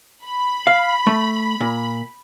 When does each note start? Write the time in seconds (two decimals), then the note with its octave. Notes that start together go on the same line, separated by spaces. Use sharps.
0.25 B5
0.67 F5
1.07 A3
1.61 A#2